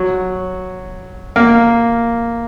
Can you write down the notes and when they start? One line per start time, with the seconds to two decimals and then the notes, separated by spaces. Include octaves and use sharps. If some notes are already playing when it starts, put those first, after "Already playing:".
Already playing: F#3
1.36 A#3